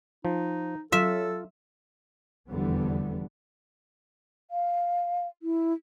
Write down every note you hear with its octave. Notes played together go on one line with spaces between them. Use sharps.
F3 D#4
F#3 F4 A4 E5
F1 E2 D3 E3 G3 B3
F5
E4